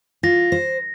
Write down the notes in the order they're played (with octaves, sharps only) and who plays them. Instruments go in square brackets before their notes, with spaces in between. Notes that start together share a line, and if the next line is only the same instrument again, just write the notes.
[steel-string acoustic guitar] F4 [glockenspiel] A#6
[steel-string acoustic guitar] C5